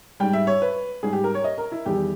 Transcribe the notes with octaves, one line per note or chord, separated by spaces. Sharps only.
G#2 G3 G5
E5
C#5
B4
G#2 G3 G#4
G4
A#4
C#5
D#5
A#4
E4
E2 D#3 G3 G4